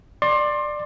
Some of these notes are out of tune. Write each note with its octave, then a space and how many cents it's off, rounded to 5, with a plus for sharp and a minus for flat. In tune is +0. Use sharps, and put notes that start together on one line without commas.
D5 +15 C6 +25